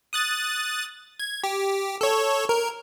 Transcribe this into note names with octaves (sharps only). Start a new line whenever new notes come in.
D#6 F#6 A6
G#6
G4
A4 C#5
A#4